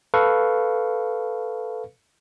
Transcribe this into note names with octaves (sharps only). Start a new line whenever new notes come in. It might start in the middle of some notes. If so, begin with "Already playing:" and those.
A4 B4 F5 C#6